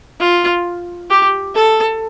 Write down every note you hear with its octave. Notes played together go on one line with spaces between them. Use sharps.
F4
G4
A4